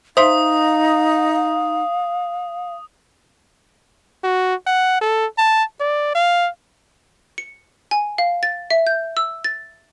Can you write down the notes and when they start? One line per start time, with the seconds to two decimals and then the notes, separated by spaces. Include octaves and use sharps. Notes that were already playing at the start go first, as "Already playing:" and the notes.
0.17 D#4 C5 E5 F5 C6 D#6
4.24 F#4
4.67 F#5
5.01 A4
5.38 A5
5.80 D5
6.15 F5
7.38 C#7
7.91 G#5
8.18 F5
8.43 A6
8.71 E5
8.87 G6
9.17 E6
9.44 A6